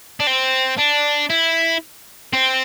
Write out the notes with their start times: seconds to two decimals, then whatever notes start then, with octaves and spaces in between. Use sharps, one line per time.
0.20 D4
0.27 C4
0.78 D4
1.30 E4
2.33 C4